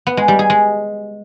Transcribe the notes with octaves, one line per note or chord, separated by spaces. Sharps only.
B3
G#3
G3
G#4
G#3